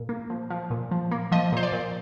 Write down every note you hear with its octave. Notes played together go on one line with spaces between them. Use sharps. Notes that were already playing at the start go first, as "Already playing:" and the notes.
Already playing: A#2
A#3
F3
F3
A#2
F3
A#3
F3 D#5
A#2 C5
D5
A#2